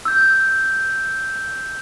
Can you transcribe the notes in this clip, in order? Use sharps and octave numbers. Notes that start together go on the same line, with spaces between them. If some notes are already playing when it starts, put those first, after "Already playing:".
E6 G6